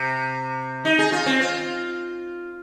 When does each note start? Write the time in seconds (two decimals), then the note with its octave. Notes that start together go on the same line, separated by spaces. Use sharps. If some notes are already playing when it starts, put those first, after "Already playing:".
Already playing: C3
0.85 D#4
0.99 G#4
1.12 F4
1.26 C4
1.40 F4